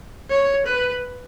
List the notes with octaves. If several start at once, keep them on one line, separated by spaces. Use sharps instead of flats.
C#5
B4